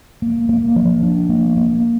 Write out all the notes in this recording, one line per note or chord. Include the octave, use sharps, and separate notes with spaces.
A#3
A#3
F3
D4
A#3
A#3